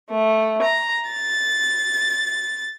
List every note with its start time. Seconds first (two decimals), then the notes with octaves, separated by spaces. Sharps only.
0.12 A3
0.62 A#5
1.09 A6